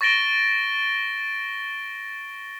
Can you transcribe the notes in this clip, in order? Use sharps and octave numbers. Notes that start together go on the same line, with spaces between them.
C#6 A6 A#6 D7 G7